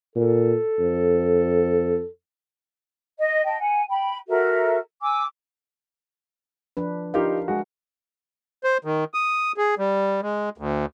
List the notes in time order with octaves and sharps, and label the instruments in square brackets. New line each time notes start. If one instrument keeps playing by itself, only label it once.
[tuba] A#2 [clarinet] A4
[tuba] F2
[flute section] D#5
D#5 G5 A5
F#5 G#5
G5 B5
F#4 A4 A#4 E5
G#5 D6 E6
[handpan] F3 D4 B4
[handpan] D4 A#4 F5 [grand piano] D#4 F4 G4
[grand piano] G#3 F#4
[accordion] C5
D#3
D#6
G#4
G3
G#3
D2